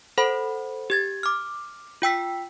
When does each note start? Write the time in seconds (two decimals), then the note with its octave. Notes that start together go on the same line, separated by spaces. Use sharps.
0.18 A4 C5 F#5 B5
0.90 G4 G#6 A6
1.23 D6 F6
2.02 F4 G5 E6 B6